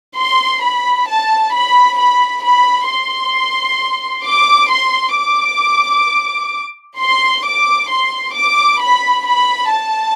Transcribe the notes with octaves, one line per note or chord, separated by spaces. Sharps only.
C6
B5
A5
B5
B5
B5
C6
D6
C6
D6
C6
D6
C6
D6
B5
B5
A5